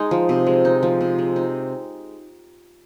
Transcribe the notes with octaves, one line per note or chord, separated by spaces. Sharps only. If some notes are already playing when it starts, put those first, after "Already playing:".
Already playing: G#3 D#4
F3
C3
G#3
D#4
F3
C3
G#3
D#4